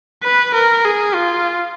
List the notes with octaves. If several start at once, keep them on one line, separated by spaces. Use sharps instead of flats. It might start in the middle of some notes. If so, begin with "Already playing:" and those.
B4
A#4
G#4
F4